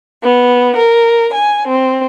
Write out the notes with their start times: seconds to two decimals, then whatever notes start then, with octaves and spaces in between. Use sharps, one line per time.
0.22 B3
0.76 A#4
1.32 G#5
1.67 C4